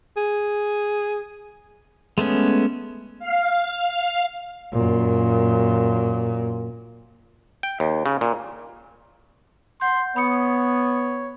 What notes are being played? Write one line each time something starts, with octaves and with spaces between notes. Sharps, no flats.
G#4
G#3 A3 B3 C#4
F5
F#2 A#2
G5
D#2
C#3
A#2
F#5 C6 G6
B3 C#5 B5 D#6 C#7